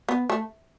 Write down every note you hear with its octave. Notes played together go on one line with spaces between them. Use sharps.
B3
A3